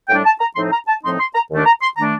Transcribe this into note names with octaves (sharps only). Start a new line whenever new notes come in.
A2 G3 D4 G5
A5
A#5
A2 F3 C4 D#4 C6
A#5
A5
A2 F3 C4 D#4 C6
C6
A#5
D#2 D#3 A3 D4
A#5
C6
D#3 A3 D4 A#5